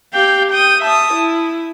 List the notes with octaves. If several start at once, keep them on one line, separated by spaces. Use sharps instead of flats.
G4 F5 G5
G5 D#6
E5 A5 D#6
E4